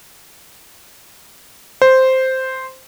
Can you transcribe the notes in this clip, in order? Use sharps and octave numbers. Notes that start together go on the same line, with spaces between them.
C5